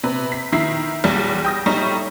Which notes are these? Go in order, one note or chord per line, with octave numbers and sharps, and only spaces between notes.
C3 B4
B6
D#3 E4 B6 C7
B1 E2 G3
G5 D#6 A#6
A2 G3 D#4 C#6